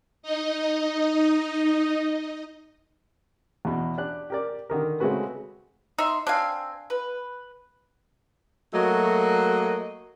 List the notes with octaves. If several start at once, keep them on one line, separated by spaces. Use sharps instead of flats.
D#4 D#5
E2 B2
D4 G4 F#6
G4 A#4 D5
D3 D#3 A#4
C#3 G#3 A3 C4 F#4 B4
D#4 E5 C6
C4 D4 F5 G#5
B4
F#3 A3 A#3 F#4 D#5